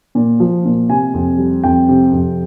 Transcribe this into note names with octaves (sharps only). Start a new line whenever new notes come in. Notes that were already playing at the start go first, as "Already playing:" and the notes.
A#2
F3
A#2
C3 G#5
F2
G3
F2 G5
C3
F2